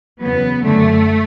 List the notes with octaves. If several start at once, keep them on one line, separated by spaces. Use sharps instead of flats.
E2 C#3 F#3 B3
F#2 D3 F#3 A3